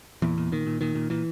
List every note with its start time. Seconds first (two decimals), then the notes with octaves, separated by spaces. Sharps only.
0.22 E2 A#2 E3
0.38 A#2
0.52 A#2 D#3
0.67 A#2
0.81 A#2 D#3
0.95 A#2
1.10 A#2 E3